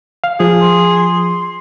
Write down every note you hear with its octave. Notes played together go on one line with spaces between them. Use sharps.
F5
F3 G#4
C6